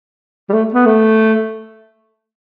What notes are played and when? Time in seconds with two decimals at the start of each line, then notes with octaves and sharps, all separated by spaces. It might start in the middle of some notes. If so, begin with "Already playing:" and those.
0.49 G3
0.53 A3
0.74 B3
0.86 A3